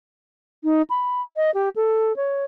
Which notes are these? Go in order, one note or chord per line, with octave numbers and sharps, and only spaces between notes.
D#4
B5
D#5
G4
A4
C#5